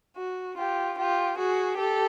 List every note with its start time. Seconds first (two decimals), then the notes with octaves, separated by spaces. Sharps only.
0.16 F#4
0.57 F4 G4
0.97 F4 G4
1.37 F#4 G#4
1.77 G4 A4